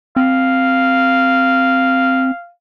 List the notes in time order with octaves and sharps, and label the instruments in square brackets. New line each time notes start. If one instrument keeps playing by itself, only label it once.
[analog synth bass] C4 [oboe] F5